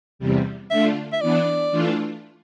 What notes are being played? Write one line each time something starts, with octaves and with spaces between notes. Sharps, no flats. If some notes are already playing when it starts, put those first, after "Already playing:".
E2 C3 G3
D3 A3 D4 F4 E5
E5
E3 B3 D4 D5
E3 A3 D4 F4